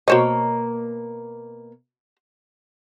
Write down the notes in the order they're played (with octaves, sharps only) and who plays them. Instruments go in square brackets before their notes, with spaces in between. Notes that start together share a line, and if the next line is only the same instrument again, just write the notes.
[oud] B2 A#3 C#5 [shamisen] F#4 C5 D#5